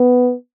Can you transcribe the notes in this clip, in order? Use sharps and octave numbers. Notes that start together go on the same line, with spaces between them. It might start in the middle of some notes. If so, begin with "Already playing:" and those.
Already playing: B3